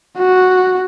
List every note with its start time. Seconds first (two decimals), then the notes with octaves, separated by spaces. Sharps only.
0.18 F#4